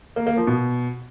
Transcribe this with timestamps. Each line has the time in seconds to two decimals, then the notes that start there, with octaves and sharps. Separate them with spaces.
0.16 A#3
0.27 A#3
0.37 F3
0.47 B2